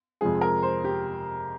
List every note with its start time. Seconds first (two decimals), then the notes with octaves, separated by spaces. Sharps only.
0.21 F2 C3 F3 G#3 G#4
0.41 A#4
0.63 C5
0.84 G4